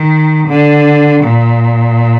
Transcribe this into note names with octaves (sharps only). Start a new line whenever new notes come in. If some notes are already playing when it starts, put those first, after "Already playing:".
Already playing: D#3
D3
A#2